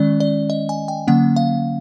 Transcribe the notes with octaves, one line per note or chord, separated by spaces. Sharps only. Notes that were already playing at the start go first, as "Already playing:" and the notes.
Already playing: D#3 G#3 C#4 D5
D5
D#5
G#5
G5
D3 F#3 A#3 C#4 F#5
F5